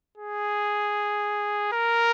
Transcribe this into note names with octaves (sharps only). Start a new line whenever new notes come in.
G#4
A#4